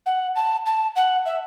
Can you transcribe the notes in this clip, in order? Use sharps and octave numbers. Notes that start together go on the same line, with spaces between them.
F#5
A5
A5
F#5
E5